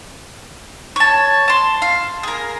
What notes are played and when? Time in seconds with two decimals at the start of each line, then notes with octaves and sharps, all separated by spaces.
0.96 C#5 A5
1.48 A5 C6
1.82 F5
2.23 G#4 A#4